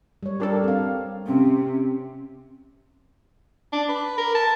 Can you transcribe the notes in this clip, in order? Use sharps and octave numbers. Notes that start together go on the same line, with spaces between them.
G3 C#5
G3 D4 G4 A4 A#4
C4 F5
C3 C4 C#4
D4
B4
A#4
A5